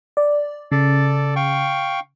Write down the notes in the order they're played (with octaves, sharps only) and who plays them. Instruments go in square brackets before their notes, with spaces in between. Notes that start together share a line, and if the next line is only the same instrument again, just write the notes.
[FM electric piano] D5
[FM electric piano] C#3 [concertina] A4 D5
[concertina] F5 G5 C#6